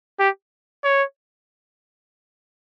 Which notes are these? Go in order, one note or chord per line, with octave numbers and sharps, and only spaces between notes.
G4
C#5